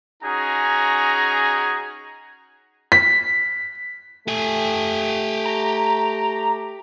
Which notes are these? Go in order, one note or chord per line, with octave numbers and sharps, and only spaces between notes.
C#4 D#4 F#4 G#4 A#5
B6
A3 G4 G#5
A#5